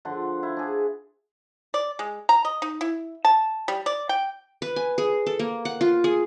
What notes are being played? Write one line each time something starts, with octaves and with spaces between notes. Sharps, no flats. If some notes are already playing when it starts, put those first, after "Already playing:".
D3 F3 F#5 C6
E4
D4 G#4
D5
G#3
A#5
D#5
D#4
E4
A5
G3
D5
G5
B4
G#5
G#4
A4
A#3
F#5
F4
G#4